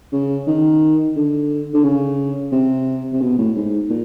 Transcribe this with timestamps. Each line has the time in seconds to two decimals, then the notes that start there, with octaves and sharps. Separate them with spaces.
0.12 C#3
0.47 D#3
1.16 D3
1.74 D3
1.83 C#3
2.52 C3
3.13 C3
3.21 B2
3.38 A2
3.56 G#2
3.90 A#2